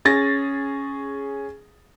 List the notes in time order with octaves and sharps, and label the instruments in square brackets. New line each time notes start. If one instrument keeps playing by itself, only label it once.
[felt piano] C#4 G#4 A6 A#6